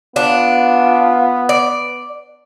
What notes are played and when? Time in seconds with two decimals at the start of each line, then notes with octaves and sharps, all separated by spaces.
0.16 B3 D4 F4
1.49 D5